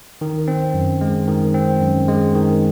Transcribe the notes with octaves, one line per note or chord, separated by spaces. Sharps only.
D#3
C4
F#2
G#3
D#3
C4
F#2
G#3
D#3